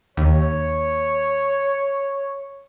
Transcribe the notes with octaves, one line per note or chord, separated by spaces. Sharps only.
D#2 C#5